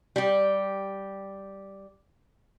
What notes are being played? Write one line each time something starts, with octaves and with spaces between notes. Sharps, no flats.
G3 G4